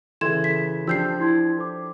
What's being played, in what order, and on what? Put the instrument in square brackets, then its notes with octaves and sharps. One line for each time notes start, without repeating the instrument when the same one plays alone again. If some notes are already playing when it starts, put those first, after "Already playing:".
[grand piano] C#3 E3 [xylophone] A4 G#6 E7 [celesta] C6
[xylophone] B6
[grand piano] F3 D4 G4 [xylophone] E6 G6 C7
[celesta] E4 C6 G#6
A4 C5 D6